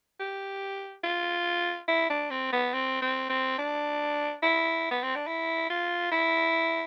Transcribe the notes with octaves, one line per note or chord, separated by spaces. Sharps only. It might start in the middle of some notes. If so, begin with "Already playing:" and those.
G4
F4
E4
D4
C4
B3
C4
C4
C4
D4
E4
B3
C4
D4
E4
F4
E4